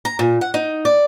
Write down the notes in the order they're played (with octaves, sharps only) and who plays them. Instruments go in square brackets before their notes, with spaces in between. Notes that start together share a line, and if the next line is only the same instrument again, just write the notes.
[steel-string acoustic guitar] A#5
A#2
F#5
D#4
D5